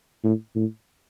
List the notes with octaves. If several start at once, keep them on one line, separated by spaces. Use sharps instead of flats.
A2
A2